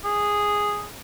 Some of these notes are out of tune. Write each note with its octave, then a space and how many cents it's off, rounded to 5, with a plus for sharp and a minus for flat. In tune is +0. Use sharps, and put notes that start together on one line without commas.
G#4 -5